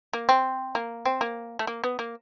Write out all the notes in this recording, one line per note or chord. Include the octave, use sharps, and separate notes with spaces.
A#3
C4
A#3
C4
A#3
A3
A#3
B3
A#3